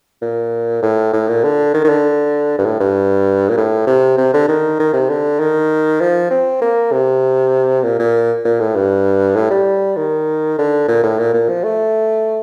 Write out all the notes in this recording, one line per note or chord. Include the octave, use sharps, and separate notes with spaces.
A#2
A2
A2
A#2
D3
D#3
D#3
D3
G2
A2
G2
A#2
A2
C3
C3
D3
D#3
D#3
C3
D3
D#3
F3
C4
A#3
C3
A#2
A#2
A#2
A2
G2
A2
G3
D#3
D3
A#2
A2
A#2
A#2
F3
A3